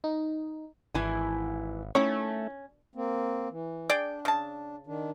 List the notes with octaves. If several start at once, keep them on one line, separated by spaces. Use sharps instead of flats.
D#4
G#1 E3 E4 G#5
D#3 A3 C#4 E4 C#5
A#3 C4
E3
D4 G#4 D5 G5
C#3 A5
D#3 D4